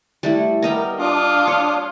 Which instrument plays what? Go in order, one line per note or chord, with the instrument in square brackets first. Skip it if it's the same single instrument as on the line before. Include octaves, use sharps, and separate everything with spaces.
[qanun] G3 A3 E4
[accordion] B3 A#4 [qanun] G4 D#5 A#5
[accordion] D4 D6 D#6 [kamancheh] F4
[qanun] C#5